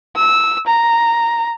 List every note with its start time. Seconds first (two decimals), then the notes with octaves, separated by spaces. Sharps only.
0.16 E6
0.66 A#5